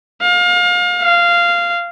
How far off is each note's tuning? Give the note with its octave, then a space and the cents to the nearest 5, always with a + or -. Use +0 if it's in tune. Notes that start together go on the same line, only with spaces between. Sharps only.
F5 +30
F5 -10